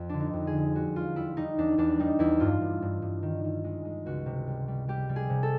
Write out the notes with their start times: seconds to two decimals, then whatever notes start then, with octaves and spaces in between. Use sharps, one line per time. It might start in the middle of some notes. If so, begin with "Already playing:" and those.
Already playing: F2
0.09 D3 D4
0.20 D#4
0.33 F2
0.47 G#4
0.55 D3
0.75 G3 F#4
0.95 E2 F4
1.16 G3 E4
1.37 G3 D#4
1.58 E2 D4
1.78 E2 D4
1.99 G3 D#4
2.19 E2 E4
2.40 G2 F4
2.61 G2
2.82 G2
3.02 G2
3.23 D#3
3.44 D#3
3.64 G#3
3.85 G#3
4.06 C#2 F#4
4.26 C3
4.48 G3
4.68 G3
4.88 G3 G4
5.09 G3
5.16 G#4
5.30 C3
5.43 A4